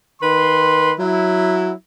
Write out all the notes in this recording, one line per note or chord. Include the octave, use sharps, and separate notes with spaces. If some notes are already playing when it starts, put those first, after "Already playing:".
D#3 B4 C6
F#3 E4